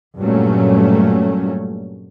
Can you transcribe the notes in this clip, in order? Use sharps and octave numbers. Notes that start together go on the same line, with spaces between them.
G2 A#2 F#3 A3 C#4